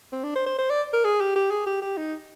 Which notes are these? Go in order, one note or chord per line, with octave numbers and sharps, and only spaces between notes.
C4
D4
C5
C5
C5
D5
A#4
G#4
G4
G4
G#4
G4
G4
D#4